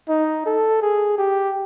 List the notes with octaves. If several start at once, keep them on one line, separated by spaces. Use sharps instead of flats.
D#4
A4
G#4
G4